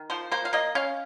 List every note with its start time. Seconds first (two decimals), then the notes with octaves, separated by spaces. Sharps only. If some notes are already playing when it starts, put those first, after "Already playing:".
Already playing: D#3
0.10 F3 C5
0.31 A#3 C5
0.45 F5
0.53 A#3 D#5
0.75 C#4 F5